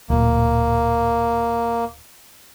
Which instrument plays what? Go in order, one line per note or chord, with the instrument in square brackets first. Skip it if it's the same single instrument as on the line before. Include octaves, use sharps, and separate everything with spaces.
[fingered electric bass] D1 A#2 [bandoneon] A#3